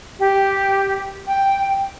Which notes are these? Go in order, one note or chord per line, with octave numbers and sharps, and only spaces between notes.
G4
G5